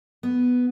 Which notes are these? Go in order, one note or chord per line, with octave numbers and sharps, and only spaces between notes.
B3